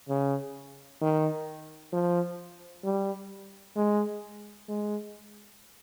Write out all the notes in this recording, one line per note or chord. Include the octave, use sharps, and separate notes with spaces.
C#3
D#3
F3
G3
G#3
G#3